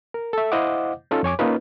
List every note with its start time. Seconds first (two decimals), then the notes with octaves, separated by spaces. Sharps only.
0.14 A#4
0.33 A4 E5
0.52 E4 C5 D#5 F5 F#5 D6
1.11 C#4 D#4 F4 A4
1.23 F2 C#5 G#5 D6
1.39 A#3 C#4 D#4 F4 B4